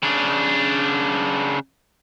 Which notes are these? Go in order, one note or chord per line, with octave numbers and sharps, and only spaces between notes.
C#3 D4